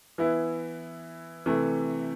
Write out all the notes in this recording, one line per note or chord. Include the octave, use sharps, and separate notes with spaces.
E3 B3 E4
C3 E3 A3